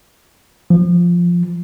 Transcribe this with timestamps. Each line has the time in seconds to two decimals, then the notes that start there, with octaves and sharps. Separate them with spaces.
0.70 F3